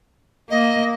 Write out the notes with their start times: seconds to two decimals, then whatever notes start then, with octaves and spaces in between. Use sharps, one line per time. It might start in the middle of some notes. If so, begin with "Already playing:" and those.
0.50 A#3 D#5